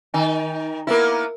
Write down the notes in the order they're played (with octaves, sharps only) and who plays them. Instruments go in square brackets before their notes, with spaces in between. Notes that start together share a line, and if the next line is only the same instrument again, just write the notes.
[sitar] D#3 D#4 [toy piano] G#5
[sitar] A#3 B3 E4 [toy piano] F4 A#4